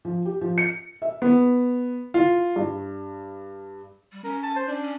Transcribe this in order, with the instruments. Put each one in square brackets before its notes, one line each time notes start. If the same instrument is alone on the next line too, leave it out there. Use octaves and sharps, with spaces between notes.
[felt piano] F3
G4
F3
C#7
E5
[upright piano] B3
F4
G2
[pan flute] G3
[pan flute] C#4 [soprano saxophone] A#4
[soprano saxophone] A5
C5
[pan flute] C#4 [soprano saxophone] D4
[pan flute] C#4